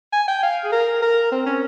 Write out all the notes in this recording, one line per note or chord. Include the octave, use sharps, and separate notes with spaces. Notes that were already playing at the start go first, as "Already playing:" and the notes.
G#5
G5
F5
G#4
A#4
A#4
C4
C#4